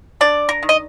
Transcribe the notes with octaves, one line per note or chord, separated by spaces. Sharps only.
D4 D5
A#4
D#3
D#5